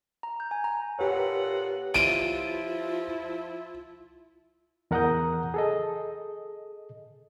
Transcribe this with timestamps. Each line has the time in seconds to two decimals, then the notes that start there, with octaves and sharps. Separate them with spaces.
0.23 A#5
0.40 G6
0.51 G#5
0.64 A#5
0.99 A#2 G4 A4 B4 C#5 F#5
1.94 F3 E4 F4 D7 D#7
4.91 E2 A#4 F#5 A#5 D#6 G6
5.54 G#4 A4 D#5